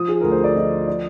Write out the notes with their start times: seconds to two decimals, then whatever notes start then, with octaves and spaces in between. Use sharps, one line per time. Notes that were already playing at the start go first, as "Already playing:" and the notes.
Already playing: F3 D#6
0.08 G#4
0.21 D2 A#4
0.32 C5
0.44 D5
0.55 F3 D#5
0.88 D5